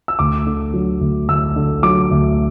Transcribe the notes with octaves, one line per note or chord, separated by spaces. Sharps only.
E6
D2 D6
D3
F#3
D2
D2 E6
D3
F#3 D6
D2